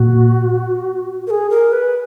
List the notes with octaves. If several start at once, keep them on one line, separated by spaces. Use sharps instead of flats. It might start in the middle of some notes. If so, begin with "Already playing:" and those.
Already playing: A#2 F#4
A#4
G#4
A#4
B4